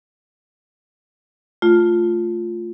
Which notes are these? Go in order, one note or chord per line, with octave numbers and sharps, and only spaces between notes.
A3 F4